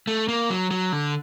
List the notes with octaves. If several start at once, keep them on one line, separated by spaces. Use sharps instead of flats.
A3
A#3
F#3
F#3
D3